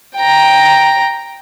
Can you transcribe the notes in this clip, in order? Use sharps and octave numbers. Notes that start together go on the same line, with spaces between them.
G5 A#5